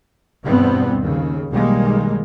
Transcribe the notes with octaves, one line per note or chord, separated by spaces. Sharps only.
E2 G2 B2 G3 B3 C4
D#2 C#3
B1 D#3 G3 G#3 A#3